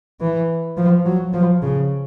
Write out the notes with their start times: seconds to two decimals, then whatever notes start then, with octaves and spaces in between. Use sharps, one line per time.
0.20 E3
0.77 F3
1.06 F#3
1.34 F3
1.62 C#3